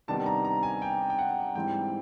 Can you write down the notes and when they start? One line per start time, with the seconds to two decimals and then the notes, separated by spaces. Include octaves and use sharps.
0.08 C3 D#3 G3 B3 D4 A5
0.26 A#5
0.45 A#5
0.63 G#5
0.82 G5
1.10 G5
1.19 F#5
1.55 G#2 E3 G3 C4 G5